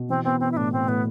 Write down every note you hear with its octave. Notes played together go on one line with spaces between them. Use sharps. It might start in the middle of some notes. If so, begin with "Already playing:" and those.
Already playing: B2
E3 C4
B3 C4
B3 C4
E4
A2 D4
A2 C4
A2 B3